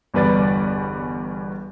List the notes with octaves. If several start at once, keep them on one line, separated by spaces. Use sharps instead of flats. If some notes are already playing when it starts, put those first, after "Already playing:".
G1 E2 G3 B4 D5 A6